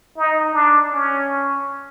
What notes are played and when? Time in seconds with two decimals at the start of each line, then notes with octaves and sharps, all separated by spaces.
0.17 D#4
0.54 D4
0.92 C#4